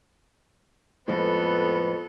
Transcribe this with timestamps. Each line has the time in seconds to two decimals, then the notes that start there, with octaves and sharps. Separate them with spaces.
1.08 F2 A2 F3 G#3 B3 A4 B4